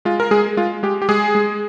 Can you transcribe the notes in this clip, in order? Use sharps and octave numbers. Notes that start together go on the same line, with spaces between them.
G#3 F4
A#4
G#3 G#4
G#3 F4
G#3 G4
G4
G#3 G#4
G#3